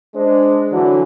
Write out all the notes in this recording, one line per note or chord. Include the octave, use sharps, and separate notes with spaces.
G#3 D4 C5
D3 E3 F#3